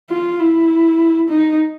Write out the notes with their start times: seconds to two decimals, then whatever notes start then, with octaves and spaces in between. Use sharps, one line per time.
0.10 F4
0.40 E4
1.29 D#4